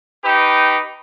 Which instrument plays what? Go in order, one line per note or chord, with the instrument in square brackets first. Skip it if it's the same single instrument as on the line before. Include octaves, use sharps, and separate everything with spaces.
[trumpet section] D#4 G4 B4